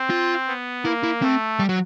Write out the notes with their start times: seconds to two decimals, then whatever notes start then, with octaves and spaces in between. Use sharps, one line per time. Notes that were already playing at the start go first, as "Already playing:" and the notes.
Already playing: C4
0.10 F4
0.48 B3
0.84 A#3 E4
1.03 E4
1.22 A3 C4
1.59 G3
1.69 F#3